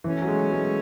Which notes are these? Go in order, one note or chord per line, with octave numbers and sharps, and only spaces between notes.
B2 E3 A3 C#4
F#3
G#3
G#3